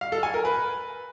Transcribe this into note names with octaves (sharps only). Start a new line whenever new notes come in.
F5
A4
G#5
A#4
B4